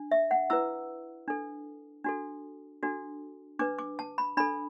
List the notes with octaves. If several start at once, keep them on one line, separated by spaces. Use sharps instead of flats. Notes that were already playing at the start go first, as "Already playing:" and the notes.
Already playing: D4
E5
F#5
E4 B4 E6
D4 A4
D4 F#4 A4
D4 F#4 A4
D4 B4 D6
D6
A5
B5
D4 A4 B5